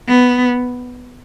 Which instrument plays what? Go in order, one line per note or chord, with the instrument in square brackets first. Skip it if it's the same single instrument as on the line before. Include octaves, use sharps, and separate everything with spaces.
[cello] B3